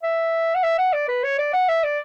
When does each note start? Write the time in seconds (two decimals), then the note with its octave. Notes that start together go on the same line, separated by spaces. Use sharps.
0.03 E5
0.55 F#5
0.63 E5
0.78 F#5
0.93 D5
1.08 B4
1.24 C#5
1.38 D5
1.54 F#5
1.69 E5
1.84 D5